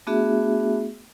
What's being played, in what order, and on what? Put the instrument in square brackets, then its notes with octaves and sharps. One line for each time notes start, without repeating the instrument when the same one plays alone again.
[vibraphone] A3 B3 D4 F#4 G#4 E5